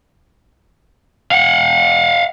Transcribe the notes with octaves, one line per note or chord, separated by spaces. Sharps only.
F5 F#5